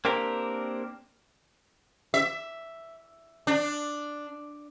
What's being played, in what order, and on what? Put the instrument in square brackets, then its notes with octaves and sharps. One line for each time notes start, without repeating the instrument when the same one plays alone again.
[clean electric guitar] A#3 C4 D4 G4 A#4
[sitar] E5
D4